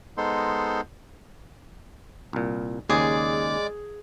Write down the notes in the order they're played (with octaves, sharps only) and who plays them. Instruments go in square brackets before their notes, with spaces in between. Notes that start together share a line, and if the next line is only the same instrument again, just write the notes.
[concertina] G#3 B3 D#4 A4 C5 C6
[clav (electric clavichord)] C2 A#2
[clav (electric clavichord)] D#2 C#3 [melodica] G#3 D5 D6 [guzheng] G#4